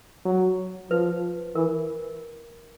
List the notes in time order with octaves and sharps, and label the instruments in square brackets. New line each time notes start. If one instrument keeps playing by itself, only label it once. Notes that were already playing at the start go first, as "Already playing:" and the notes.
[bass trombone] F#3
[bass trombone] F3 [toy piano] B4
[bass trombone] E3 [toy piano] A#4